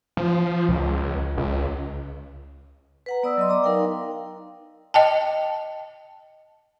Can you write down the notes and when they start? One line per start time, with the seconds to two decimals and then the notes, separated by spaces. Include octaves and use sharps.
0.17 F3
0.69 C#2
1.38 C#2
3.06 B4 F#5 A#5
3.23 B3 D5 D#6 E6
3.37 F#3 D#5 C6
3.49 D5 A#5 D6
3.64 D#4 A#4 F5 G5
4.94 D#5 G5 A5